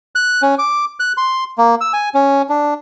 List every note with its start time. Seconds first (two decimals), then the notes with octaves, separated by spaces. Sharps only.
0.15 F#6
0.42 C#4
0.59 D6
1.00 F#6
1.17 C6
1.58 A#3
1.81 E6
1.93 G#5
2.14 C#4
2.49 D4